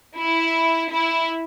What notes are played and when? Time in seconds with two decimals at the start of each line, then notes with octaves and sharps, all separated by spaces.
0.18 E4
0.91 E4